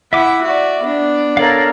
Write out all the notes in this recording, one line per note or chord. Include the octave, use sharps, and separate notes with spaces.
E4 E5 F#5 D6
F#4 D5
B3 D4
A4 A#4 C#5 D5 F5